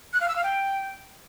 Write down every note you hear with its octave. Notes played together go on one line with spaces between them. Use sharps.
F#6
F5
E6
F5
G5